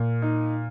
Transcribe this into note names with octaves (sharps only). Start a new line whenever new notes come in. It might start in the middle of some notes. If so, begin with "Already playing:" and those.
Already playing: A#2
D#4